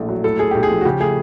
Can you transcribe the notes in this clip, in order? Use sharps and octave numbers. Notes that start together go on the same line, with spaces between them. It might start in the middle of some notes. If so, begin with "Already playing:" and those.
Already playing: A#1 A2 A3
F#3
A2 A4
A3 G#4
B1 G4
G#4
F3
F#4
C#3 G4
A3 G#4